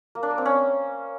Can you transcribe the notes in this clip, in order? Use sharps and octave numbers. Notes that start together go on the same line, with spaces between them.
A#3
D4
A#3
C4
C#4